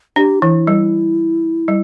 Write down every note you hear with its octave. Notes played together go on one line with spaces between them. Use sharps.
D4 G4
E3 E4
G3
G3